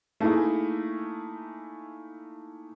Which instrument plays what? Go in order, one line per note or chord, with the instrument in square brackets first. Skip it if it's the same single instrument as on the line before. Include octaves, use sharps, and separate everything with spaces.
[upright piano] A3 A#3 D#4 E4 G#4